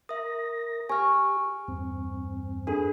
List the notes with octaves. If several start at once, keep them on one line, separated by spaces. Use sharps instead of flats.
A#4 E5 D#6 A#6
G4 G#5 C#6 F6
E2 G2 C4
D4 G#4 A4 B4